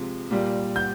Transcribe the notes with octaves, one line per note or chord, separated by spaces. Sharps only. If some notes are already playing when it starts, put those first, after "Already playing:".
Already playing: C3 F3 G#3
A#2 G3
G6